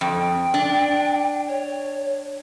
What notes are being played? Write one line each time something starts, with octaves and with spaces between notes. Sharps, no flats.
F2 G5
D4
C#5